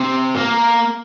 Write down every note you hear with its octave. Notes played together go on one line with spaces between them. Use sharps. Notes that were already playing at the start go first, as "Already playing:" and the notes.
Already playing: C3
A#3